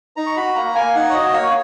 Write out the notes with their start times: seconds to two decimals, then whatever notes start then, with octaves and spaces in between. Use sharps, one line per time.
0.16 D#4 A#5
0.27 C#6
0.36 F#4 B5
0.55 A#3 A#5
0.75 A#3 G#5
0.95 D#4 F#5
1.10 C#5
1.14 F#4 D#5
1.33 A#3 C#5